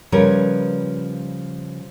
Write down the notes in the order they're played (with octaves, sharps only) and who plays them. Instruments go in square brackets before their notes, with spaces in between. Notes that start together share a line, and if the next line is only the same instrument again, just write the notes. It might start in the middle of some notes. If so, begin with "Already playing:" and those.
[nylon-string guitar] C#3 F3 G3 A#4 B4 C#5